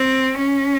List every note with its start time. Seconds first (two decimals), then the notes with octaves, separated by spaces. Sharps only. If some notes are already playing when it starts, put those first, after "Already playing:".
Already playing: C4
0.38 C#4